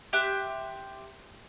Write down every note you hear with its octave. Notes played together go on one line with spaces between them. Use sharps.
G4 E5 C6 F#6